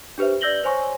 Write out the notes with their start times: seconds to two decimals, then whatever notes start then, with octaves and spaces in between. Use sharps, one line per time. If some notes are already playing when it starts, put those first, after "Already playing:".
0.18 D4 G4 B4 C5 E5
0.41 D5 E6 G6 A#6 F#7 G7
0.64 C5 C#5 G#5 C6 C#6